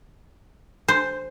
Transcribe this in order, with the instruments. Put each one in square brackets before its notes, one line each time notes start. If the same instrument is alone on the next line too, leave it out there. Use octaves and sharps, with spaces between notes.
[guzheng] C5